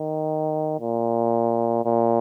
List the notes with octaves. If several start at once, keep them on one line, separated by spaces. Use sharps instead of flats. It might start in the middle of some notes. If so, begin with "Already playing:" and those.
Already playing: D#3
A#2
A#2